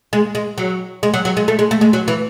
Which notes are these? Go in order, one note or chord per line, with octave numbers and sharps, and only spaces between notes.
G#3
G#3
F#3
G#3
F#3
F#3
G#3
A3
G#3
A3
G#3
F#3
E3